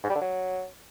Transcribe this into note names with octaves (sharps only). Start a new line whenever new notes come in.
G#2
G3
D3
F#3